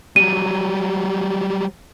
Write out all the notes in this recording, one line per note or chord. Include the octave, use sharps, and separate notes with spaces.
F#3 G3 D#7